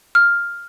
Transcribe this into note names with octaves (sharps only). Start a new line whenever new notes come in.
F6